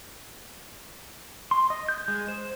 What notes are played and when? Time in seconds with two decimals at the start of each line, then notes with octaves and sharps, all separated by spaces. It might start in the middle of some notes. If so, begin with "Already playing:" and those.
1.51 C6
1.70 D#5
1.89 G6
2.08 G#3
2.28 C5